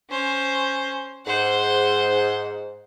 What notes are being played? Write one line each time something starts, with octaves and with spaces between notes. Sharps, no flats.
C#4 C5
G#2 C5 F#5